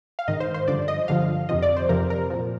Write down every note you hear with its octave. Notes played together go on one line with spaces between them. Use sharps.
F5
G#2 D#3 D#5
C5
C5
G2 D3 F3 D5
D#5
G2 D3 F3 F5
F2 C3 F3 D#5
D5
C5
F2 C3 F3 A#4
A#4
A#2 F3